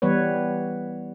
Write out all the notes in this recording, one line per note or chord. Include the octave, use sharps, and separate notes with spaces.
E3 G3 B3 B4 C#5